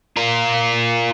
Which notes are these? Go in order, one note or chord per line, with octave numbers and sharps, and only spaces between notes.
F4 A#4